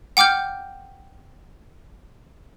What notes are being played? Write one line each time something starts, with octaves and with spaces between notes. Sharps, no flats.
F#5 G5 D6 F6 G6